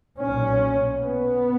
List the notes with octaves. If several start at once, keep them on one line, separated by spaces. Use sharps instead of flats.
B1 A#2 C#4
B3